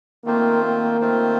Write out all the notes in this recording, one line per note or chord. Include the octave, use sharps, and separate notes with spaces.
D#3 A3 A#3 C4 F4 C5
A#3
D#3 A3 C4 F4 C5